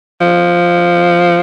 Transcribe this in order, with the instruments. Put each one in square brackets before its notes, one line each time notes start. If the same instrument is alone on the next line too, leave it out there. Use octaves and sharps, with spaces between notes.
[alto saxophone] F3